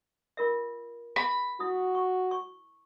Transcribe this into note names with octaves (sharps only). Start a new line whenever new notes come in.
F4 A#4 E5
E5 B5
E4 F#4 D#6
C#6
C#6